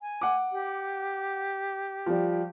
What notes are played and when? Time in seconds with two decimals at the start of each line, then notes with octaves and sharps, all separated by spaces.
0.01 G#5
0.21 F#5 D6
0.52 G4
2.06 F3 G3